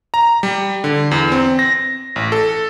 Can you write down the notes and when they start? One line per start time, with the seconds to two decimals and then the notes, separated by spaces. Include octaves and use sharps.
0.14 A#5
0.43 G3
0.84 D3
1.11 E2
1.32 C4
1.59 A#6
2.16 A1
2.32 A4